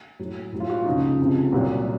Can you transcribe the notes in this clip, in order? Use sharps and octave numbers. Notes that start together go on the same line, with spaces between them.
A2 F#3
A2 F#3
F4
F#4
F4
C#2 C#3 F3 D#4
C#2 C3 F3
C2 A#2 F#3